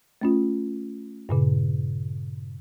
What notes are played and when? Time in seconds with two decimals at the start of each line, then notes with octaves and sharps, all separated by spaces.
0.22 A3 C#4 F4
1.29 G2 A#2 C#3